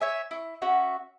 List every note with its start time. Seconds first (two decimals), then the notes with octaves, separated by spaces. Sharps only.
0.01 C#5 E5 G#5
0.31 E4 C#6
0.62 C#4 F#4 E5 F#5